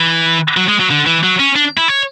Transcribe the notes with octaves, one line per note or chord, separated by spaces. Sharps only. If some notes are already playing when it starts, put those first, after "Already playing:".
Already playing: E3
F#3
G#3
F#3
D3
E3
F#3
C#4
D4
E4
C#5